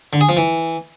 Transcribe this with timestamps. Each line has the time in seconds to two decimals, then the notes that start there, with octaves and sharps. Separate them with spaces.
0.13 D3
0.21 G#4
0.29 F3
0.37 E3